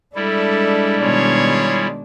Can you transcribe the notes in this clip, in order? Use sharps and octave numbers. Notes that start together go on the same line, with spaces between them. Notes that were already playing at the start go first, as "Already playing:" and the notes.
G3 G#3 D4 E4 A4 E5
B2 D#3 F4 G#4 C#5